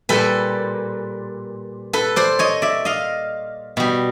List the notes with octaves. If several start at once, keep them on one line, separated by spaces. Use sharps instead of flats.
A#2 G3 A4 B4
A4 B4
C5 D5
C#5 D#5
D5 E5
D#5 F5
B2 G3